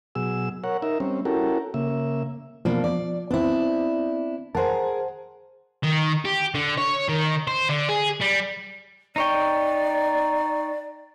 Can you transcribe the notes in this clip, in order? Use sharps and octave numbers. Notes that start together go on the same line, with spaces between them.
B2 F#3 G#4 E6
A#4 C#5 F#5
D#4 A#4 E5
G3 C4 C#4
C#4 E4 F#4 G4 A4 A#4
C#3 A#3 E5
B2 F3 A#3 D4
D5
B3 C4 D4 E4
G#4 A#4 C5 F#5 A5
D#3
G4
D3
C#5
D#3
C5
D3
G#4
G3
D#4 C#5 D5 G5